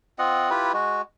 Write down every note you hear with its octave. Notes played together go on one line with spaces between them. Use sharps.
C4 F4 D#5 F#5
E4 F4 G4 B4
G#3 F#4